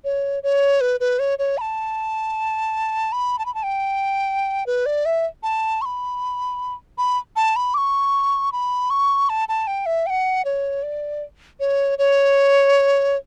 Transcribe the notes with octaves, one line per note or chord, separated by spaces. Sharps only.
C#5
C#5
B4
B4
C#5
C#5
B5
A5
B5
A5
B5
A5
G5
B4
D5
E5
A5
C#6
B5
B5
A5
B5
D6
C#6
B5
C#6
A5
A5
G5
E5
G5
F#5
C#5
D5
C#5
C#5